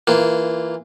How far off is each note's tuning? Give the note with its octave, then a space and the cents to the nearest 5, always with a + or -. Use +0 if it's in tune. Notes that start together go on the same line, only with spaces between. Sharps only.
E3 +0 A#3 +0 F4 -20